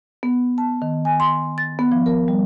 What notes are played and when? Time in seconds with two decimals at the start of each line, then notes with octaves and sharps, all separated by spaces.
0.23 B3
0.58 A5
0.82 D#3
1.05 G#5
1.20 C6
1.58 A6
1.79 B3
1.92 F3
2.06 A#4
2.28 G3